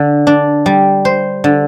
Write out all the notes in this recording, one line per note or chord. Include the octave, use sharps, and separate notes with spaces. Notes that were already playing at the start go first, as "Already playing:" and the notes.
Already playing: D3
D4
G3
C5
D3